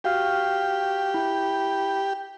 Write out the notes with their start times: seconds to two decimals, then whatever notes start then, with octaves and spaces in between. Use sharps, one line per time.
0.04 F#4 G4 F5 F6
1.14 E4